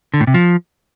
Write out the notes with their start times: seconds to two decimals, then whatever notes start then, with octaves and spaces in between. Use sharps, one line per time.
0.14 D3
0.20 A2
0.27 C3
0.34 F3